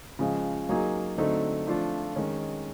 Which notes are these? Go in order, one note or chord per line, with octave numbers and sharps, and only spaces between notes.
C#3 F3 G#3
F#3 A#3 D#4 G#4
D3 F#3 A3 C4 D#4
F3 A3 D4 F4
D#3 G#3 C#4